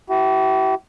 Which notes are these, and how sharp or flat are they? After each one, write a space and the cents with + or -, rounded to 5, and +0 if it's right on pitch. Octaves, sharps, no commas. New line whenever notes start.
E4 +0 G4 -45